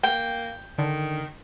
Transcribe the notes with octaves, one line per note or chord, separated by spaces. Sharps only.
A#3 G5
D3 D#3